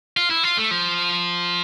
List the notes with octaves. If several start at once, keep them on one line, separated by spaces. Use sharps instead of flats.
F4
E4
F4
A3
F3